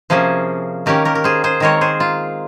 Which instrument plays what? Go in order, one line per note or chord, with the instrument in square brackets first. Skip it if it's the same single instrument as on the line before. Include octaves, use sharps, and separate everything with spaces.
[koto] C3 F3 A#3 C#4 G#4 C5
D#3 A#3 C#4 G4 A#4
G4 A#4
A#4
G#4 C5
G#4 C5
D#3 G#3 C4 A#4 C#5
G#4 C5
F4